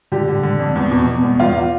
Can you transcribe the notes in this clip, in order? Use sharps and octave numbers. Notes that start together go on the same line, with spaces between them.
D3 G4
D3
D3
F2
E2
B2
B2
E2
E2 F4